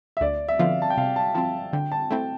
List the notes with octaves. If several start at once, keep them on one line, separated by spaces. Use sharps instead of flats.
E5
D2 D5
E5
D3 F3 B3 F4 F5
A5
G5
C3 F5
A5
F3 C4 A5
D3 G5
A5
A3 C4 E4 G5